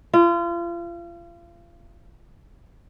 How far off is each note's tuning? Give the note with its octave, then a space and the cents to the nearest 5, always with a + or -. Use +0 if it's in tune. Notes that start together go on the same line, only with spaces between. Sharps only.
F4 -35